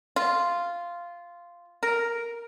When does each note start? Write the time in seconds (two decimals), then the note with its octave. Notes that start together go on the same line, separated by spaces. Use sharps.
0.16 F4
1.83 A#4